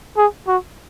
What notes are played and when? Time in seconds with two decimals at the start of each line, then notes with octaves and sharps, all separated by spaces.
0.17 G#4
0.48 F#4